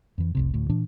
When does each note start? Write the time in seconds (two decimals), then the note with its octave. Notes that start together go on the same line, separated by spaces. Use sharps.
0.18 F2 E3
0.35 F1 C2 C3
0.54 D2 A2
0.69 A#2 E3 D4